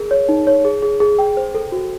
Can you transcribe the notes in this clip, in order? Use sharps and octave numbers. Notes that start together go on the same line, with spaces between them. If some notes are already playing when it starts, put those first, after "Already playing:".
Already playing: G#4 A#4
C#5
D#4
C#5
G#4
G#4
G#4
G5
C5
A4
F#4